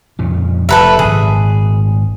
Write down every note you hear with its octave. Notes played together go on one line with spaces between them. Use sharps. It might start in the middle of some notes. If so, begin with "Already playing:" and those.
F2 A#2 C#3
F1 A4 B4 E5
G#1 A#2 G#4